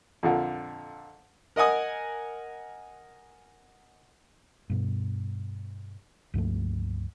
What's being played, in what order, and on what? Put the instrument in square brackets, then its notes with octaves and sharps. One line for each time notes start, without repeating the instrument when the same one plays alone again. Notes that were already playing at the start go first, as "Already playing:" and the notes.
[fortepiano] F2 A#2 D3
A#4 D#5 F#5 G#5 D#6
[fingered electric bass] G2 B2
C#2 G2 F3 A3